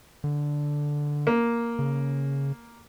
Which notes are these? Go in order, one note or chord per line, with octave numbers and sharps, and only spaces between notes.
D3
A#3
C#3